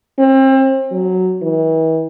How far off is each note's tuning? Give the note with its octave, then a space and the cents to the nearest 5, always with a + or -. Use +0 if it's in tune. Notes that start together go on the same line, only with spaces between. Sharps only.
C4 +35
F#3 +0
E3 -40